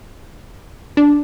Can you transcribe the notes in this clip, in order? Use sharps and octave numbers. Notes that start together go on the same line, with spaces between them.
D4